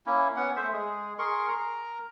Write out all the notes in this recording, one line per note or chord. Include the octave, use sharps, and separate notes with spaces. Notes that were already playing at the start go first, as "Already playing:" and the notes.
A#3 C#4 E4
B3 C#4 F#5
A3 C5 E5
G#3 G#4
G#4 A#4 C6 C#6
A#4 A#5